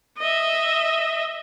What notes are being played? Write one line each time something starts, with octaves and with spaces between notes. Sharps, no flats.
D#5 E5